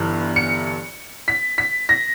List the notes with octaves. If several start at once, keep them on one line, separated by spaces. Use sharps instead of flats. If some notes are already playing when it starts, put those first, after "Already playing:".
Already playing: G1 G2 E3
C#7
B6
B6
A#6